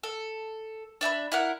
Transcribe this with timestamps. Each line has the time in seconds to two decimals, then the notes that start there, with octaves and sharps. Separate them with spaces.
0.03 A4
1.01 D4 E5 G#5 B5
1.32 E4 A#4 F#5